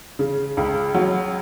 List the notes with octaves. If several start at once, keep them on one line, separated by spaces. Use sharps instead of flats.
C#3
C#2
F#3